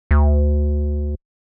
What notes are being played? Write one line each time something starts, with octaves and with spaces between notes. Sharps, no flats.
D2